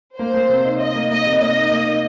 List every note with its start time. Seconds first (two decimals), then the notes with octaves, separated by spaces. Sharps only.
0.18 A#3 C5
0.34 A#3
0.49 C3
0.65 D#4
0.80 D#4 D#5
0.96 A#3
1.10 A#3 D#5
1.26 C3
1.41 A#3 D#5
1.57 D#4
1.71 A#3
1.87 D#4